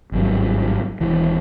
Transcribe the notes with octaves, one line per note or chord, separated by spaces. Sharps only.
G#1 G2 F#3
D#1 E3